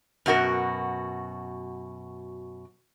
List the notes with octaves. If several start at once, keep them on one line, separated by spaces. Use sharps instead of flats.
F#2 B2 F#4 A#4